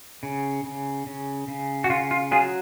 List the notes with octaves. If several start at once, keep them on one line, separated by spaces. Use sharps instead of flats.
C#3
C#3
C#3
C#3
F#4
C#3 F4
F4
F#3 F4 G#4